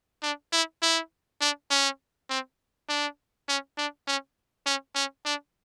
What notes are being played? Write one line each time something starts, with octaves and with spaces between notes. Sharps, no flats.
D4
E4
E4
D4
C#4
C4
D4
C#4
D4
C#4
C#4
C#4
D4